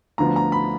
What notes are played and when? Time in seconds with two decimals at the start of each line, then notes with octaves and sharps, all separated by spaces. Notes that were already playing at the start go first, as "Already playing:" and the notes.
0.18 D2 D3 F3 B3 F4 A#5
0.36 A#5
0.52 B5